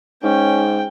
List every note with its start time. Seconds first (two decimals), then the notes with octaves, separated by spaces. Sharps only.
0.23 G#2 C#4 G5